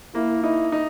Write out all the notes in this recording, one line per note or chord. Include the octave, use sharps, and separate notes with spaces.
A#3 E4
D#4 E4
D#4